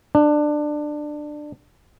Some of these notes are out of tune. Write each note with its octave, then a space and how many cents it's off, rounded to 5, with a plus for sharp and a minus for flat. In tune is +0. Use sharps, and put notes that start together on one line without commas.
D4 +20